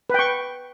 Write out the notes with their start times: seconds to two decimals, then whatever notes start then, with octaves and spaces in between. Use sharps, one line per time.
0.10 B4
0.14 G5
0.19 C#6